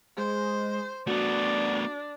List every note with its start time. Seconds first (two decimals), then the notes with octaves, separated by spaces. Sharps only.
0.18 G#3 C5
1.07 A3 B3 D4 F#4